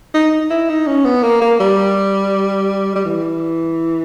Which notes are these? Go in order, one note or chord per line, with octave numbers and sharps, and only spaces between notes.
D#4
E4
D#4
C#4
B3
A#3
A#3
G3
G3
E3